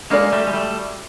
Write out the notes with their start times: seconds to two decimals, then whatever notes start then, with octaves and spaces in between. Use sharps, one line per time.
0.10 G#3 A#3 C#4 F#4 A4 D5
0.32 G3 A3
0.47 G#3
0.54 G3 A3